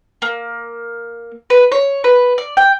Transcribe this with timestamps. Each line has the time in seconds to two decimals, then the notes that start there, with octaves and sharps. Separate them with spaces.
0.22 A#3
1.50 B4
1.72 C#5
2.04 B4
2.38 D5
2.57 G5